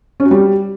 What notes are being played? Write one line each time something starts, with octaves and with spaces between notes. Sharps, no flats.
C#4
F#4
G3